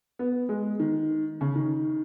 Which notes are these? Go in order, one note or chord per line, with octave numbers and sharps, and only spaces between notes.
B3
G#3
D#3
C#3
D#3